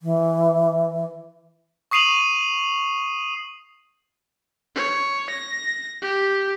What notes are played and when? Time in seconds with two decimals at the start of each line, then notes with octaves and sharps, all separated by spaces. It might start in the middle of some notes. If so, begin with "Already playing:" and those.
0.02 E3
1.91 C#6 D#6 C7 D#7 F7 F#7
4.75 C#5
5.30 A#6
6.02 G4